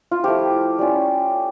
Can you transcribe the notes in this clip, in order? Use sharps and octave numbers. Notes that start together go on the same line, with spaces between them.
F4
F3 A3 E4 G4
G3 C#4 F4